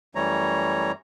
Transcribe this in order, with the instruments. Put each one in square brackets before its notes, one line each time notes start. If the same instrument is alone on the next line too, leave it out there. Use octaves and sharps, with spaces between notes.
[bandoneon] F#2 E3 G3 A3 C#5 A#5